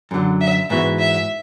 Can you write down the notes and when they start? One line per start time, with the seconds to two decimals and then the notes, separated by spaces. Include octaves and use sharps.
0.11 F#2 D3 F#3
0.41 E5
0.70 G#2 E3 B3 F#4 E5
0.99 E5